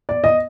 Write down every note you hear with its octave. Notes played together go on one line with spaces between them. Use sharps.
D5
D#5